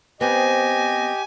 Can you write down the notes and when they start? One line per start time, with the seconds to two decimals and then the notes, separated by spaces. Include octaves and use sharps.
0.21 B3 C4 G4 D#5 G#5